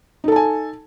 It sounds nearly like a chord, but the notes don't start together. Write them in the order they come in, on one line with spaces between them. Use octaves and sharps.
D#4 A4 A5 G#5